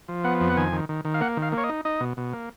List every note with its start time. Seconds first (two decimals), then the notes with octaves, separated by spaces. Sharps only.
0.08 F3
0.24 B3 F#5
0.40 F2
0.50 F#5
0.57 D#3 G#5
0.72 D#3
0.89 D#3
1.05 D#3
1.14 F5
1.21 A#3 F#5
1.37 D#3
1.42 F5
1.52 A#3
1.58 C#5
1.64 D#5
1.69 D#4
1.85 D#4 D#5
2.00 B2
2.17 B2
2.33 A#3